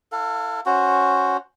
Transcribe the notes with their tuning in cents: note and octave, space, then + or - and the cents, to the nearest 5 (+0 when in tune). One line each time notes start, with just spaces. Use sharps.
E4 +0 A4 +30 F5 +30
C#4 +0 F#4 +0 C5 +5